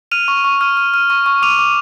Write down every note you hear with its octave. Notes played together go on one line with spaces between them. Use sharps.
F6 D#7 F7
C#6
C#6
F6
F6
F6
C#6
C#6
D6 D#7 F7
D6